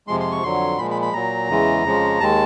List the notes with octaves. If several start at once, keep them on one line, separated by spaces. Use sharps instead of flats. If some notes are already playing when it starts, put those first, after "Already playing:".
F2 C3 F3 G#3 C6
C6
C#6
F2 D3 F#3 C6
A#2 F3 G#3 B5
B5
B5
A#2 F#3 A#5
E2 C#3 E3 G#3
F2 C#3 F3 G#3
D#2 D#3 G#3 A5